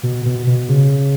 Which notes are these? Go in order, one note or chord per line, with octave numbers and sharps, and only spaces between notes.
B2
B2
B2
C#3